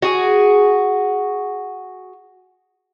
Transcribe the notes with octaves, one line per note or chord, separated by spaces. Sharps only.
F#4 G#4